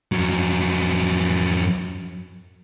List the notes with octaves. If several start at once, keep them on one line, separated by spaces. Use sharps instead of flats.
F2 F#3